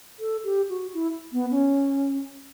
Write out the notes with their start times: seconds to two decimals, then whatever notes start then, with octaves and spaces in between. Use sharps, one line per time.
0.19 A4
0.44 G4
0.69 F#4
0.94 E4
1.32 B3
1.51 C#4